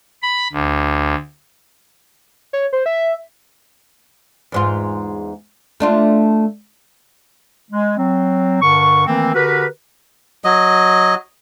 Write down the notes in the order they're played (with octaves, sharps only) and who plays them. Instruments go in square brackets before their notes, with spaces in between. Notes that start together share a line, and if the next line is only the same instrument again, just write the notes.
[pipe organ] B5
D2
[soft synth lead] C#5
C5
E5
[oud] E2 G#2 F4
A3 D4 F4
[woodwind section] G#3
F#3 C4
G2 D3 A#4 C#6
D#3 E3 A3 A#3 C4
D3 F#4 G4 A#4 B4
[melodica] F#3 D#5